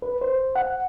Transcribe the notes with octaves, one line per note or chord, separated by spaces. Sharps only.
B4
C5
F#5